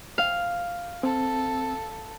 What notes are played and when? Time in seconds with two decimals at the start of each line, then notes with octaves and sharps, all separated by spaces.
0.18 F5
1.03 C4 A4